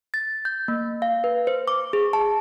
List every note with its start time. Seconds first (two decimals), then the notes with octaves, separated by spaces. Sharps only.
0.14 A6
0.45 G6
0.68 A#3
1.02 F5
1.24 B4
1.47 C5
1.68 D6
1.93 G#4
2.13 A5